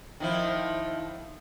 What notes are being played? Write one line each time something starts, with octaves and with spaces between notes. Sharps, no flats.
D#3 F3 E4